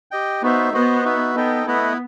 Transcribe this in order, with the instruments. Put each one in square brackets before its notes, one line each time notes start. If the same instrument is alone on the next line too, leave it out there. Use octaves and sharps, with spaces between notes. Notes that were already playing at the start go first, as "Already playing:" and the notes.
[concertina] G4 D#5 G5
[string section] B3 [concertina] D#4 F#4 C5 E5
[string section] B3 [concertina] F#4 C5 D#5 F#5
[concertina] D#4 F#4 B4 E5
[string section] B3 [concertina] D#4 A4 D#5 G5
[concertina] A3 E4 B4 D#5 F#5 [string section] B3